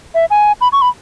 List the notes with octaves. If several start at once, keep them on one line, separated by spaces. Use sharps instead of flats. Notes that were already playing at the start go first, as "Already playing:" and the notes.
E5
G#5
B5
C#6
B5